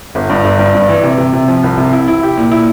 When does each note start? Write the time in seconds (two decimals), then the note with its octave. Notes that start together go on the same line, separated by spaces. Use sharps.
0.15 G1
0.29 G2
0.44 G1
0.59 G2
0.75 G2
0.88 E3
1.03 C3
1.18 C3
1.33 C3
1.48 F3
1.64 C2
1.78 C3
1.93 E4
2.08 E4
2.23 G4
2.37 A#2
2.51 E4